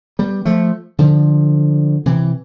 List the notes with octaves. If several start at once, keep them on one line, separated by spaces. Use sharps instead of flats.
G3 B3
F3 A3
D3 F3
C3 E3